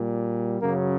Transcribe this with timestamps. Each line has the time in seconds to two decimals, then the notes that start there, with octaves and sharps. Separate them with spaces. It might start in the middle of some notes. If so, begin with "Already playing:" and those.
Already playing: A#2 G3
0.60 F#2 C#3 F#3 A#3